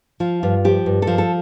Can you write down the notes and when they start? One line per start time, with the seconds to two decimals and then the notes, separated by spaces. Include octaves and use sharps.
0.20 F3 F4
0.43 G2 F4
0.65 F3 G4
0.86 G2
1.02 A4
1.07 F3
1.18 A4